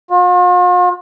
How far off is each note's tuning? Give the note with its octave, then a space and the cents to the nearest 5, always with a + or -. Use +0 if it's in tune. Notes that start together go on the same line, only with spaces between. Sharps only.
F4 +45